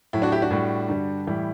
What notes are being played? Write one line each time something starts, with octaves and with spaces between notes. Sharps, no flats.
A2 F#3 E4
D4 F#4
E4 G4
D4 F#4
A2 G3
G2 D3 G3
A2 E3 G3 E4